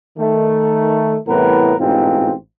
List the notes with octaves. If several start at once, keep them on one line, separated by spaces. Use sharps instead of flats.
D#3 A3
C2 A2 E3 B3 A#4 B4
A1 G#2 B2 C4 F4